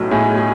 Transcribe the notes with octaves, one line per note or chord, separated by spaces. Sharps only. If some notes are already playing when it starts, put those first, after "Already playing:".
Already playing: B1 A2 F#3 A3
A2 G#4
G#4